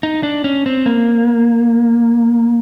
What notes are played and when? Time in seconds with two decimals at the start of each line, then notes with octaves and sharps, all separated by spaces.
0.03 D#4
0.23 D4
0.44 C#4
0.66 C4
0.86 A#3